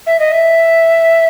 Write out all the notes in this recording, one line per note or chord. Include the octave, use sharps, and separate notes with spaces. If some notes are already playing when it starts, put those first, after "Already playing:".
E5
D#5
E5